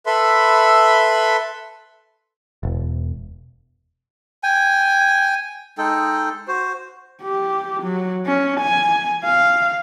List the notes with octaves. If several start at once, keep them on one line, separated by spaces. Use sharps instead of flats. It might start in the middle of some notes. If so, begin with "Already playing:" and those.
A4 B4 E5 B5 C6
E1
G5 G#5
G#3 D#4 A4 G5
F#4 C5
G4
F#3
C#4
G#5
F5